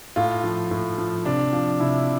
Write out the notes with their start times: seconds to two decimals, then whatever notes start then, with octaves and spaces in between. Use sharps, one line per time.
0.16 A2 F4
0.44 F3
0.71 A2
0.98 F3
1.25 C3 D4
1.53 F3
1.80 C3 E4